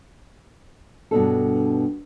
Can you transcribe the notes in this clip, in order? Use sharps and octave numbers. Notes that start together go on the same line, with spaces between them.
G2 B2 D4 A4